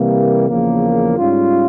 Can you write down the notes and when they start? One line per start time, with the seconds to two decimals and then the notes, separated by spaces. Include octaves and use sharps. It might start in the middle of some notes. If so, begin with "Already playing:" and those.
Already playing: C3 E3 G3 A#3
0.49 E2 C#3 F3 A#3
1.18 G#2 G3 C#4 F4